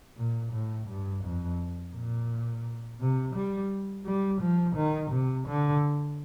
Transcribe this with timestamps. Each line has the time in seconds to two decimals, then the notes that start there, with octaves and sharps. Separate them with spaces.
0.17 A#2
0.52 A2
0.88 G2
1.24 F2
1.94 A#2
3.00 C3
3.35 G3
4.05 G3
4.41 F3
4.76 D#3
5.11 C3
5.48 D3